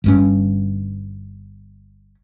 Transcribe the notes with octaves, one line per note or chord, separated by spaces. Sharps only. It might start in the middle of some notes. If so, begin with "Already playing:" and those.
G1 G2 C#4